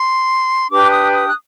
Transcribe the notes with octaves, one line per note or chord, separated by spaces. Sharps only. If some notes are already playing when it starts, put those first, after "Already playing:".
Already playing: C6
D4 G4 B4 D6
D#6
D#6
F#6